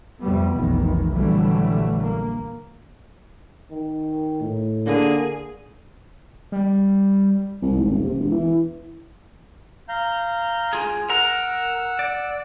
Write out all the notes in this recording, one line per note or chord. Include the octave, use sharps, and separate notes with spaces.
F2 C3 G3 A3 B3
F1 B1 D#3 E3
A#1 D3 E3 F#3 G3 A3
A#3
D#3
A2
D3 A#3 G#4
G3
C2
G#1
D#1
C3
E1
E3
F5 A#5 G6
F4 G#4
A#4 F#5 A#5 E6
D5